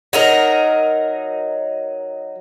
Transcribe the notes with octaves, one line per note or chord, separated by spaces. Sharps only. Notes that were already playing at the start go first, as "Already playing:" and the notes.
F#3 D#4 A#4